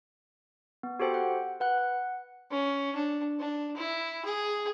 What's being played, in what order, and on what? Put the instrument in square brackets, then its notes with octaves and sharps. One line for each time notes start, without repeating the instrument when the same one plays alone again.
[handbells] B3
F#4 G4 A4 C5 G5
F#5
B4 F#5 F#6
F#5
[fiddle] C#4
D4
D4
E4
G#4